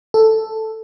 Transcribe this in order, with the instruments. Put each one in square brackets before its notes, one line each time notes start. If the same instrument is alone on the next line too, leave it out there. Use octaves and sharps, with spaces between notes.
[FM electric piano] A4